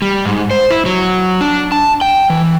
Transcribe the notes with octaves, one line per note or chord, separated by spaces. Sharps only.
G3
G#2
C5
E4
F#3
D4
A5
G5
E3